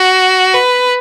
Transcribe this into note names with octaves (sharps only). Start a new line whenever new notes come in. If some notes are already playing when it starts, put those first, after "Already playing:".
Already playing: F#4
B4